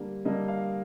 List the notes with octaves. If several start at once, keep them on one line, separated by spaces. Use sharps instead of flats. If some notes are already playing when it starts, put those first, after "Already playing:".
Already playing: D3 G3 A#3
D3 G3 A#3 D#5
F5